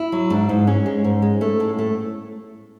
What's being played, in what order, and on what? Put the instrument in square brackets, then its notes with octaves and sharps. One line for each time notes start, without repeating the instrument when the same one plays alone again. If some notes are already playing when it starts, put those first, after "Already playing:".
Already playing: [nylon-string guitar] E4
F#3
G#2 D4
G#2
G#3 C#4
G#3
G#2
G#3
A3
A2
A3